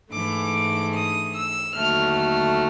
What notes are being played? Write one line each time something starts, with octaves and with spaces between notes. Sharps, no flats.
G#2 E3 A3 D4 D6
D#6
E6
D#2 D3 F#3 A3 F6
F6